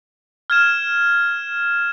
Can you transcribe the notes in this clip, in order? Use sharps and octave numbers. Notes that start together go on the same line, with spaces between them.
F6 G#6 E7